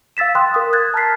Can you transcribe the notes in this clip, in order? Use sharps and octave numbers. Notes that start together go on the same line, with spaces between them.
F5 E6 A6 B6 E7
G5 C6 D#6 F#6
A#4 C6 D#6
F#6 G#6 A6
A5 A#5 F6 F#6 B6 C7